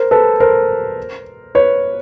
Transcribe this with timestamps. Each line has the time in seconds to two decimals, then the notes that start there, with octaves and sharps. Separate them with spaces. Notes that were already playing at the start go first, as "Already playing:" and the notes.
Already playing: A#4 C5
0.11 A4 B4
0.40 A#4 C5
1.55 B4 C#5